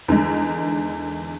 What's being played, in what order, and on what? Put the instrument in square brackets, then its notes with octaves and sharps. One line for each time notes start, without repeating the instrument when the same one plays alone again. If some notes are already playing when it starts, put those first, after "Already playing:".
[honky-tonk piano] E2 D3 D#3 G#3